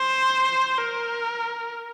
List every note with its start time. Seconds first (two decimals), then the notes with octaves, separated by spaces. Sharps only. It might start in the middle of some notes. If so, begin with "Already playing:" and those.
Already playing: C5
0.78 A#4